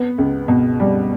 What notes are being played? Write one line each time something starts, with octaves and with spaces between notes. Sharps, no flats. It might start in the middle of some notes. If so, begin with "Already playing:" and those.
Already playing: B3
C#2
B2
G3